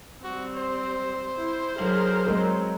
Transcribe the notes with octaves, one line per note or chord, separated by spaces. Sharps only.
G3 C4 F#4
C5
E4
B1 G#4 A#4
F#3 G#3 C4 A#4